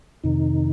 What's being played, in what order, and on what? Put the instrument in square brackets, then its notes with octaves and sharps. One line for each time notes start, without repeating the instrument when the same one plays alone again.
[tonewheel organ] F2 C3 D#3 D#4